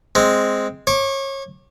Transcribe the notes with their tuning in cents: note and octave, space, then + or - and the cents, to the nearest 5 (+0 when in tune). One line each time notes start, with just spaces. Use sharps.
G#3 +0 C4 +0
C#5 -30 D6 +0